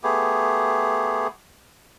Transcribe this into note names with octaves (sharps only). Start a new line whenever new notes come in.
A3 B3 G4 G#4